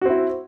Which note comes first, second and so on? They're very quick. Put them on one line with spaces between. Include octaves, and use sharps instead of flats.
F#4 C4 E4